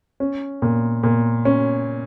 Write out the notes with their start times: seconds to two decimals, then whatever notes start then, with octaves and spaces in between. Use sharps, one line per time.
0.20 C#4
0.62 A#2
1.03 A#2
1.45 C#4